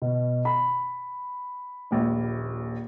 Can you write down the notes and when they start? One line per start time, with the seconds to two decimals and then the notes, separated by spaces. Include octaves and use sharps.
0.02 B2
0.45 B5
1.91 D#1 A#1